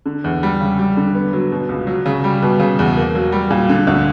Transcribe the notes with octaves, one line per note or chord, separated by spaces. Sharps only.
D3
E2
G3
C#3
G3
D3
B3
F#3
B2
C#2
F#3
C#3
G3
B2
C#3
E2
A#3
F#3
G3
A#2
D3
D2